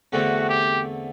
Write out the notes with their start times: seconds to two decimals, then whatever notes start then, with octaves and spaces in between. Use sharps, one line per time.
0.12 E2 D3 A3 C4 F#4
0.49 G4